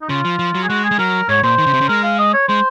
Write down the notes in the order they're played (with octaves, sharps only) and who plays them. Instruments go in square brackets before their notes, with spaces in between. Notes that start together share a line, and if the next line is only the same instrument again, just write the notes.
[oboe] D#4
[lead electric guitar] C#3 [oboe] F4
[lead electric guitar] F3
F3
F#3
[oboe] G#4
[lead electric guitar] G#3 [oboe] F#4
[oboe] G#4
[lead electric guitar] G#3
[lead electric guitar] F#3 [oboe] A#4
[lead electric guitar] G#2 [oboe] C#5
[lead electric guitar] A#2 [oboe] C5
[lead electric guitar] D#3
C#3
C3
C#3
[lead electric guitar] G#3 [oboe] A#4
[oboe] F5
D#5
C#5
[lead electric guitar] G#3 [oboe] C5